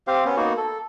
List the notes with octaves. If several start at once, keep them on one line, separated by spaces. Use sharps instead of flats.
C4 G4 C5 F5
B3 C#4
A#3 B3 D#4 F#4
A4